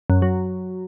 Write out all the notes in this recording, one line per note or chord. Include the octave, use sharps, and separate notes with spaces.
F#2
F#3